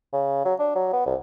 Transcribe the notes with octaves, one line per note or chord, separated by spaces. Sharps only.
C#3
F#3
D4
F#3
B3
C2